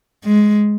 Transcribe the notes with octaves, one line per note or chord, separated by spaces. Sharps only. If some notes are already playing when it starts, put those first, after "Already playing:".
G#3